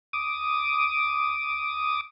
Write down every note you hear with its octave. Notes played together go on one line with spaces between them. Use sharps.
D6 D#6